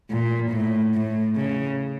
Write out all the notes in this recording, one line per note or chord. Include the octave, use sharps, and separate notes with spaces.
A#2
A2
A2
C#3